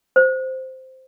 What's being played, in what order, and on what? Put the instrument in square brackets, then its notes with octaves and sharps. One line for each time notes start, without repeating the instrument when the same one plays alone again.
[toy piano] C5